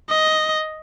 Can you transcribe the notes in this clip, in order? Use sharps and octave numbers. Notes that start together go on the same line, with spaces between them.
D#5